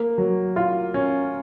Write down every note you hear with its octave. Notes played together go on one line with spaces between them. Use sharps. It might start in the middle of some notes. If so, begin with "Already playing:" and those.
Already playing: A#3
F#3
F4
C#4